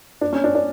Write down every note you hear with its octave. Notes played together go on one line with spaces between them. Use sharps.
D4
C#4
D4
D4